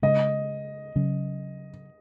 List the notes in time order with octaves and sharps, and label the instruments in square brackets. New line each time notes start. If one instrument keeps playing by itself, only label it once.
[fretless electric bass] C#3 G#3 C#4 [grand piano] D#5
[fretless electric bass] C#3 F#3 C#4